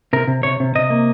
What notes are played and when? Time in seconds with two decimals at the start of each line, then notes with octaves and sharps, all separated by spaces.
0.13 C3 A#4
0.28 C3
0.43 C3 C#5
0.60 C3
0.75 C3 D#5
0.90 A#3